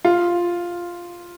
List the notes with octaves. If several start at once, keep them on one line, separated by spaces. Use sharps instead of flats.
F4